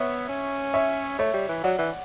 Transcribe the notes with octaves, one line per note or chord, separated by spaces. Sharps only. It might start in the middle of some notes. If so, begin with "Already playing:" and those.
Already playing: B3 C#5 E5
C#4
C#5 E5
A3 C#5 E5
G3
E3
F#3 D5 F#5
E3